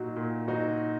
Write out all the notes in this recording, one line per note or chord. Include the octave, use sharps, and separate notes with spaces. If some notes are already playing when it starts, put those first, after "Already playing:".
Already playing: A#2 F#3 D#4 F#4
A#2
F#3 D#4 F#4